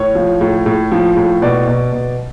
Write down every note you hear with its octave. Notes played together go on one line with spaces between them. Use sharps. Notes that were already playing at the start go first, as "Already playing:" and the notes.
Already playing: A2 C#5
F3
A2
A2
F3
A2
B2 D5
B2
B2